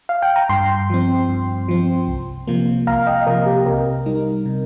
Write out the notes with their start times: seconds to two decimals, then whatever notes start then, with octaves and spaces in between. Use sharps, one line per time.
0.09 F5
0.22 G5
0.36 A#5
0.49 G2 G5 C6
0.90 F3 C4
1.29 G2
1.68 F3 C4
2.08 C2
2.47 C3 F3 A#3
2.87 C2 F5 A#5
3.07 D#5 G5
3.27 C3 F3 A#3 A#4 D#5
3.46 G4
3.66 C3 A#4
4.06 G3 D#4
4.46 C3